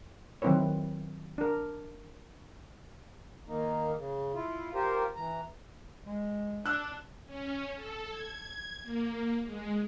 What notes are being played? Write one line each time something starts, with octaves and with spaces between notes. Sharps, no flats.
D#3 F#3 C4 E4 B4 C#5
D4 A#4
D#3 A#3 D#4
C#3
E4 F4
F4 G4 A#4 C5
E3 A#5
G#3
D4 E6 F#6
C#4
A4
G#6
A#3
G#3